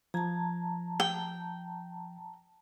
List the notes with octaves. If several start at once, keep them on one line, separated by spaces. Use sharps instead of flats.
F3 A5 A#5 G#6
G5